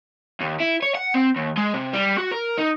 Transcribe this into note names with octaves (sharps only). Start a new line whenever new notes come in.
D#2
E4
C#5
F#5
C4
D#2
G#3
C3
G3
F#4
A#4
D#4